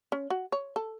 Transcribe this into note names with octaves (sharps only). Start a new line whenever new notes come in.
C#4
F#4
C#5
A4